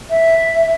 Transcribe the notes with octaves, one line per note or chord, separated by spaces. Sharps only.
E5